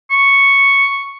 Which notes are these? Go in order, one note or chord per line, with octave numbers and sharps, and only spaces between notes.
C#6